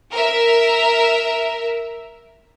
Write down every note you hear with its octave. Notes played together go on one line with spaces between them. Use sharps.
A#4 E5